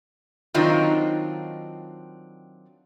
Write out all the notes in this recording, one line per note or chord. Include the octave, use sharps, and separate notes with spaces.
D#3 F#3 C4 D4 D#4 F4